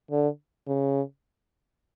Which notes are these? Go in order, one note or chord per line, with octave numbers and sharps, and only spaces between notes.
D3
C#3